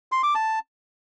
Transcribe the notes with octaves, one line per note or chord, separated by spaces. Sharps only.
C6
D6
A5